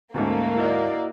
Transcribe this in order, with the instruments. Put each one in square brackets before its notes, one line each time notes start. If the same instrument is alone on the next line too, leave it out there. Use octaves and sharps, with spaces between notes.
[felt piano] D2 G#2 [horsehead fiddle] A3 C#4 [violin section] A#3
[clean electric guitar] E4 F#4 D#5 [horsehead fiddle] A#4 D5